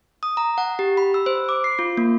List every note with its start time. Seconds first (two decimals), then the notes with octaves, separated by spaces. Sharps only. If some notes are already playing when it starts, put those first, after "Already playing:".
0.23 D#6
0.37 A#5
0.58 F#5
0.79 G4
0.97 B5
1.14 E6
1.26 C5
1.49 D6
1.64 C7
1.79 F4
1.97 A#3